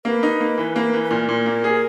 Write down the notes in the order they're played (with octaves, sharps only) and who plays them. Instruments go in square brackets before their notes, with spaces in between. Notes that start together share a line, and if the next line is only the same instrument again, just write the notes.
[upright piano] A#3 [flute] B4
[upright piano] D#4
A#3
E3
A#3
E3
[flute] B4
[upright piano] A#2 [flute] A#4
[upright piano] A#2
A#3
G#4